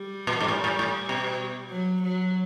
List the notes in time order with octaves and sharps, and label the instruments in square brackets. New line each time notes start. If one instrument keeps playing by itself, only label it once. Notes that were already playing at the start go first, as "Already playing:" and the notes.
Already playing: [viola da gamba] G3
[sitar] A#2
G#2
A2
A2
A2
B2
[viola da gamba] F#3
F#3